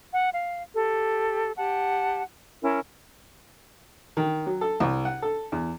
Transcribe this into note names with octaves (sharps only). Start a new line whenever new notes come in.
F#5
F5
G4 A4
G4 F#5 A5
C#4 E4 A#4
D#3
F#3
A4
C2
F#5
A4
E2